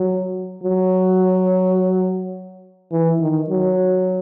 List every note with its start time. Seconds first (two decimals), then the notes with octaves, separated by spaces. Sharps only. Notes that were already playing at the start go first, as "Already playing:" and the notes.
Already playing: F#3
0.63 F#3
2.92 E3
3.21 D#3
3.50 F#3